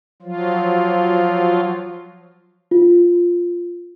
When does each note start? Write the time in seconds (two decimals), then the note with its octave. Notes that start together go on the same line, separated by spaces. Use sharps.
0.22 F3 F#3 F4
2.71 F4